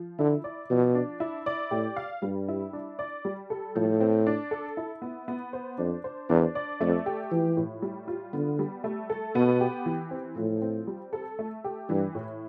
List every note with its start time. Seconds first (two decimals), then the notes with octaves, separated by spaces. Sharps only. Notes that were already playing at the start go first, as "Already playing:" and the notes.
Already playing: F3
0.19 D3 E4
0.44 D5
0.70 B2 F3
0.95 D4
1.20 E4
1.46 D5
1.71 A2 G4
1.96 F5
2.22 G2 G3
2.48 E4
2.73 D4
2.99 D5
3.25 G3
3.50 A4
3.75 A2 F3
4.01 C4
4.27 D4
4.51 A4
4.77 E4
5.02 B3
5.28 B3
5.53 C5
5.78 F2 D4
6.04 C5
6.29 E2 D4
6.55 D5
6.80 F2 A3
7.06 G4
7.31 E3 F3
7.57 A2
7.82 G3
8.08 F4
8.33 D3 B3
8.59 G3
8.84 A3
9.10 A4
9.35 B2 B3
9.61 G4
9.86 E3
10.11 C4
10.36 A2 F3
10.62 C4
10.87 G3
11.13 A4
11.39 A3
11.64 G4
11.89 G2 E3
12.15 A2